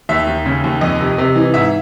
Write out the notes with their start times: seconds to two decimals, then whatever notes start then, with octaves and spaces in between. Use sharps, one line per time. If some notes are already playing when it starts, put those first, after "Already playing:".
0.09 D#2 E5
0.27 D#2
0.46 C#3
0.64 D#2
0.81 F2 D#5
1.01 C3
1.18 C3
1.36 E3
1.54 G#2 E5